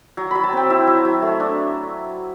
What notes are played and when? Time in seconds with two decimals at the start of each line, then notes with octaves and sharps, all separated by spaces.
0.17 F#3
0.31 F#3 B5
0.44 A5
0.53 C4 G5
0.70 E4 E5
0.87 F#3
1.05 F#3
1.22 A3
1.40 D4